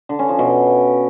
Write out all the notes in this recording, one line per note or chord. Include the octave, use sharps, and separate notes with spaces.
D3
C#4
F3
B2